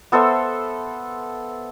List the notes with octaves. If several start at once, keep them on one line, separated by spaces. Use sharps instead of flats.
B3 A4 C5 E5